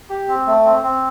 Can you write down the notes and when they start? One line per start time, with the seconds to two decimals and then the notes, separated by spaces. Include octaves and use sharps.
0.10 G4
0.28 C4
0.47 A3
0.64 C4
0.83 C4